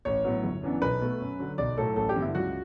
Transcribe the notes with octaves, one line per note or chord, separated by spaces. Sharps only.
A1 C#5
A2 F#3 B3
G1
F#2 E3 B3 D4
B1 B4
B2 A3
F#2
D3 F#3
B1 D5
A2 F#3 A4
A1 A4
G4
G2 D3 G3 B3
E4
C#2 F#4